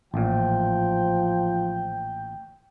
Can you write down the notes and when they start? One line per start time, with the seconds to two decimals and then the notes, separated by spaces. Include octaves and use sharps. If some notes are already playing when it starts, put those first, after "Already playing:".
0.14 A1 A#2 F3 G5